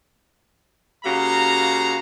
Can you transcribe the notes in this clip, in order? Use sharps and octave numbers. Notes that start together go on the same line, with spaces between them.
C#3 A#3 F#4 G4 F5 A#5